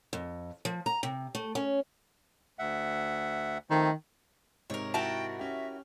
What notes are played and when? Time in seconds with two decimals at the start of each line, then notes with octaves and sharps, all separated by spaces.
0.13 F2
0.65 F3
0.86 A#5
1.03 C3
1.35 A3
1.55 C#4
2.59 D2 E5 F#5
3.70 D#3 F3 A3 C4
4.70 G#2 C3 A#4 C#5
4.94 E4 F#4 A#4 G5 A5
5.39 C#4 G4 E5